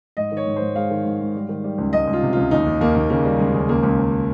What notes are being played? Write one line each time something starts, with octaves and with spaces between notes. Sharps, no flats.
G#2 D#5
D#3
C#5
G#2
C5
G#2
G#3 F5
D#3
G#2
G#2
G3
D#3
G3
C#2
C#2 D#5
C#2
F4
C3
C#2 F4
D#2 D#4
D#2
D#2 A#3
D#2
C#3 A#3
G3
C#3 G#3
D#2
C#2 A#3
C#2
C#2